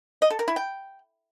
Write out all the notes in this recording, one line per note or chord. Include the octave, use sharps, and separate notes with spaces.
D#5
A4
A#4
E4
G5